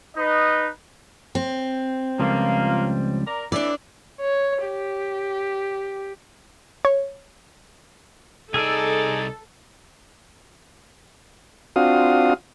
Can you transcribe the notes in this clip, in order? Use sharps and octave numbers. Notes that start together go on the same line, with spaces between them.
D#4 B4 D#5
C4
C#2 F3 G3 A#3 F4
A#4 D5
E3 D4 D5
C#5
G4
C#5
C2 D#4 G#4 A4 D5 E6
C4 D4 F4 F#4 F5 D#6